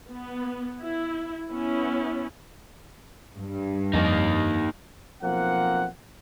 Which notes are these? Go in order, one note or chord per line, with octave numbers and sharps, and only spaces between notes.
B3
E4
B3 C#4 E4
G2
F2 A#3 D#4
B1 F3 A#3 C4 F#5